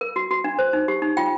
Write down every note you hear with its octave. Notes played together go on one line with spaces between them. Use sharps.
A#4
F#4
F#4
D4
C5
D#4
G4
D#4
F4 G5